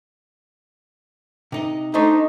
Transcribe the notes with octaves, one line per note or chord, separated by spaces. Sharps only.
C3 D#4 D#5
A3 D4 D#4 C5